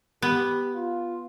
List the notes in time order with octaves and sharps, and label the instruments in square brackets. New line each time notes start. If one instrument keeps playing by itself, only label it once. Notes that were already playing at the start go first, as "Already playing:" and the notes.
[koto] B3 [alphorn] G4
[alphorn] F4